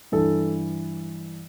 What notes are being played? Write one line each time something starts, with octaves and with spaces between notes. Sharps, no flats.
G2 E3 A4